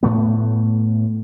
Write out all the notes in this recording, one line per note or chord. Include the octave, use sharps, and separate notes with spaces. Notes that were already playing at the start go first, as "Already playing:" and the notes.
A2 A3 B3